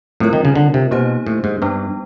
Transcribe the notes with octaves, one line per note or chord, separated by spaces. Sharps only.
A2 G3 C4 F4 A#4 C#5
D#3
C#3
D3
C3
B2 A#3 D#4 G4 C5
A2
G#2
G2 G3 B3 D4